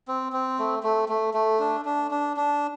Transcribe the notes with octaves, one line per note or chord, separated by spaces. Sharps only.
C4
C4
A3
A3
A3
A3
D4
D4
D4
D4